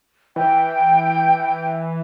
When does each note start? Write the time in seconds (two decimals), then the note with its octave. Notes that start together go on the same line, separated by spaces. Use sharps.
0.36 E3 G5